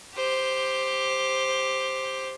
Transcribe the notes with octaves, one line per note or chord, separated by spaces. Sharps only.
G4 C5